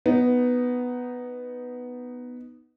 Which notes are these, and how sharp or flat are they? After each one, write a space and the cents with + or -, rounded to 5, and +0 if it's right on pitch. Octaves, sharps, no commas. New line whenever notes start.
B3 +0 D#4 +0